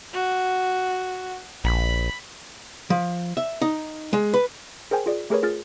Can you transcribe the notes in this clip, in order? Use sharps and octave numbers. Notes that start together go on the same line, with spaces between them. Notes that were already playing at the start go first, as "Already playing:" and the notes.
F#4
A#1 B5
F3
E5
D#4
G#3
B4
G#4 A#4 C5 G5 G#5
F4 G#4 D5
A3 G4 G#4 A#4 B4 C#5
F4 G#4 F6 A6